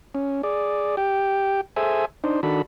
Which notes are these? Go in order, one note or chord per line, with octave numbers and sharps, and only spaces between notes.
C#4
G#4 D5
G4 G5
G#4 A4 C5 E5 G#5
D4 D#4 C5
D#3 D4 F#4 A4 B5